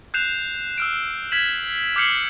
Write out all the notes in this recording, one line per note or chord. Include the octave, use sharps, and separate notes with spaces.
F#6 G6 C7 E7 F7
E6 F6 D7
F6 G#6 B6 E7 F#7
D6 F6 G6 C7 C#7 F#7